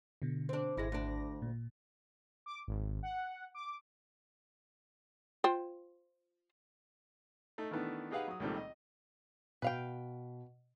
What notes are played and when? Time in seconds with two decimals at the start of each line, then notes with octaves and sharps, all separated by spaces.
0.22 B2 D3
0.49 C4 D4
0.77 G#1 G#3 E4 A#6
0.92 D2 D4
1.42 A#2
2.46 D6
2.68 G#1
3.03 F#5
3.55 D6
5.44 F4 C5 G5
7.58 A3 D#4
7.71 D#3 E3 A3 B3 D4
8.11 D#4 G4 G#4 B4 F5 F#5
8.28 F#3 D#6
8.40 C#2 A#2 D#3 G3 A3 C4
8.57 D#5
9.62 B2 B4 F5 G5